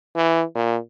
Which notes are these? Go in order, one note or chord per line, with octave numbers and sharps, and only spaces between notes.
E3
A#2